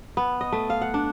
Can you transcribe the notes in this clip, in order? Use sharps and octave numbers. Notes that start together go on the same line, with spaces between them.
B3
D#5
A3
F5
F#5
D4